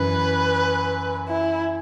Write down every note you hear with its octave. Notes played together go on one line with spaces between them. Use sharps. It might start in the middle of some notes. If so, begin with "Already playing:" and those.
Already playing: F#2 E3 B4
E4